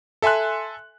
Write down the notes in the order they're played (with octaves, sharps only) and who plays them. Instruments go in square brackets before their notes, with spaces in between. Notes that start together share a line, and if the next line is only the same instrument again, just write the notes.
[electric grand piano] A4 E5 G#5 C6 F#6